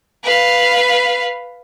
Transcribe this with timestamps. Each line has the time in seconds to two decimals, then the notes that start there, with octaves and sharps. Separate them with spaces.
0.24 B4 F5